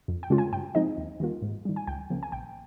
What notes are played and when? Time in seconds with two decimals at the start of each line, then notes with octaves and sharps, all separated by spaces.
0.08 F2
0.23 G5
0.30 C#3 G#3 C#4 F4
0.38 G#5
0.52 G2 G5
0.75 F3 G#3 C4 D#4 D#5
0.98 D#2
1.20 D#3 G3 A#3 F4
1.42 G#2
1.65 D#3 G3
1.76 G#5
1.87 C#2 G5
2.10 C#3 F3 A#3
2.23 G#5
2.32 A#1 G5